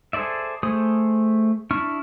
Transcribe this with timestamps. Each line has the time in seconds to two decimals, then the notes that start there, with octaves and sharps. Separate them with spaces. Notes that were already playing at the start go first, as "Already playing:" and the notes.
0.13 G#4 A4 C5 D5 E5
0.63 A3 G#4 C5 D#6
1.71 D4 E4 C#6 F6